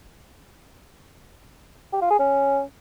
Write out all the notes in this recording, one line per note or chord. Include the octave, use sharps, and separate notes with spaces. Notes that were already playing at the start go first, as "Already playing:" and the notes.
G4
F4
G#4
C#4